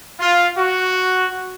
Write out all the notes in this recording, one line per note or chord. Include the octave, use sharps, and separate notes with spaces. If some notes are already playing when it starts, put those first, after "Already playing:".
F4
F#4